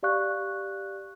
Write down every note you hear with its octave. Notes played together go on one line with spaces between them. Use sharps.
G4 D5 F5 C#6 F#6